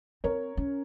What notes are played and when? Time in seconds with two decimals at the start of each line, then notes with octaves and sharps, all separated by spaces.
0.24 C4 A#4 C#5
0.57 C#4